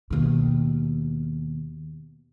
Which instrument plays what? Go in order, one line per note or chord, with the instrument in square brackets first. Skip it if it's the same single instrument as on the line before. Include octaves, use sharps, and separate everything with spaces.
[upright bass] D#2 B2